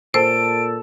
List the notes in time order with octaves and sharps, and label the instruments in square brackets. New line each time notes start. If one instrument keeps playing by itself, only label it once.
[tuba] A#2 [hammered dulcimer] A4 [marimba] C5 [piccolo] D7